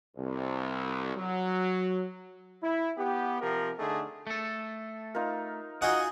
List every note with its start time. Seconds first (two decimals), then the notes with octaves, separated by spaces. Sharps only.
0.17 C2
1.17 F#3
2.62 E4
2.97 B3 G4
3.41 C3 F3 G4 A#4
3.79 D3 A3 D4 D#4 G#4
4.27 A3 A4
5.15 D#4 F4 A#4
5.82 D#4 F4 F#4 G#4 D#5 F#5 G#5